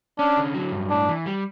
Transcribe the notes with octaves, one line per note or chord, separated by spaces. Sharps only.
C#4 D4
D3
F#3
G2
A2 D4
E3
G3